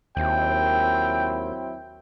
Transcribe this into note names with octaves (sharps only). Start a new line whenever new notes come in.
D#2 F#3 C4 E4 G5